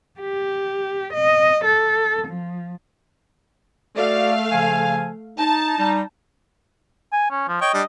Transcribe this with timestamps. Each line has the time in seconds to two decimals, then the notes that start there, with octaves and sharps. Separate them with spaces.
0.20 G4
1.13 D#5
1.64 A4
2.27 F3
3.96 A3 F#4 D5 F5
4.50 C#3 F3 G#5
5.38 D#4 A5
5.77 G3 D#4
7.12 G#5
7.30 C#4
7.48 F3
7.61 C#5 D#5 G5
7.74 G3 D4